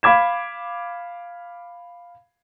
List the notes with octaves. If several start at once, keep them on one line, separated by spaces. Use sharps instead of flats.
F5 B5 D6 G#6 E7